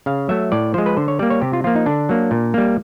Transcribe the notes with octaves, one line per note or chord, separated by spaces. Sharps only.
C#3 F5
F#3 A3 E5
A2 D5
F3 G#3 C5
B4
D3 C5
C#5
G3 A#3 D5
C#5
C3 G4
F4
F3 A#3 F4
D#4
D3 D4
F#3 A#3
A#2
G3 A#3